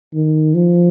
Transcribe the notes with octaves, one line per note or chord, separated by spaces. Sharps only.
D#3
F3